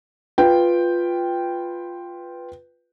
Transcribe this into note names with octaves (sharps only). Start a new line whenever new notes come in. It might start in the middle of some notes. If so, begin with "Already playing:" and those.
F4 B4 G5